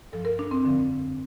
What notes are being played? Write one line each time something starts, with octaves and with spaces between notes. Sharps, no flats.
G2 F3 A4
A#4
D4
C4
F2 D3 F3